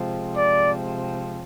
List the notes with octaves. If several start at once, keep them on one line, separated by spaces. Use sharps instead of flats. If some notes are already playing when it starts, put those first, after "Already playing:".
Already playing: C3 F3 G#3 C4
D5